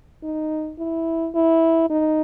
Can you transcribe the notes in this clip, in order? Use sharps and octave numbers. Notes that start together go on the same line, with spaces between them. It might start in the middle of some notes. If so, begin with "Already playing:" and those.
D#4
E4
E4
D#4